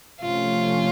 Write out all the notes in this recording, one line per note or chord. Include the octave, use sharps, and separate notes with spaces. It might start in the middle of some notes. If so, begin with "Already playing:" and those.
C3 F3 A3 C#4 F4